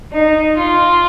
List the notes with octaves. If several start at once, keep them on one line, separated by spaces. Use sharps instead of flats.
D#4
F4